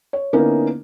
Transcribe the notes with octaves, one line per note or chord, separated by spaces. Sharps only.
C#5
D3 A#3 B3 C#4 D#4 E4